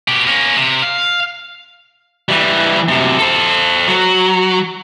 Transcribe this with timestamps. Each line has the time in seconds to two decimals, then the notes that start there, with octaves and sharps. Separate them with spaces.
0.08 B2 G4
0.27 A#3 C#4
0.57 C3
0.82 F5
2.29 E3 G3
2.88 F#2 C3
3.19 A4 C5
3.88 F#3